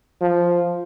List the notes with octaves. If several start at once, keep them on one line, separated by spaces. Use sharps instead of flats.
F3